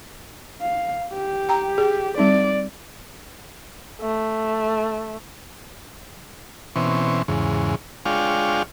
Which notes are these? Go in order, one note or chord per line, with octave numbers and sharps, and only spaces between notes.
F5
G4
G5 A#5
G#4
G3 C4 D#4 D5
A3
B2 E3 C4 C#4
E2 G#2 C#3
G#3 D4 F4 C#5 F5 G5